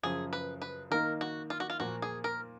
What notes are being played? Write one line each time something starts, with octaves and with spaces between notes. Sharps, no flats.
F#2 C#3 F3 G#4
B4
B4
D#3 A#3 D#4 A#4
F#4
F4
F#4
F4
A#2 F3 A#3 F#4
G#4
A#4